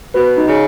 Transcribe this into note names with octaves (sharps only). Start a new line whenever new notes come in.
B2 B4
D#4
C#3